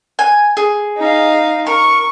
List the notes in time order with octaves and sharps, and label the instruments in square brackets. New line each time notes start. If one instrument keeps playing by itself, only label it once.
[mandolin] G#5
G#4
[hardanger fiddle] D#4 F5
[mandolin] A#4 [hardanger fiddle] C#6